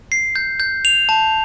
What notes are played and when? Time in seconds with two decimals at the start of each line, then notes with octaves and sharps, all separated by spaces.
0.12 C7
0.36 G6
0.60 G6
0.85 F7
1.09 A5